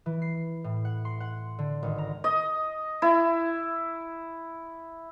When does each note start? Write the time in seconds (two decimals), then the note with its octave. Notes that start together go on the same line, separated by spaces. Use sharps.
0.06 E3
0.22 C7
0.64 A2
0.85 F#5
1.05 C6
1.20 F#5
1.59 D3
1.83 G#1
1.98 A#5
2.24 D#5
3.02 E4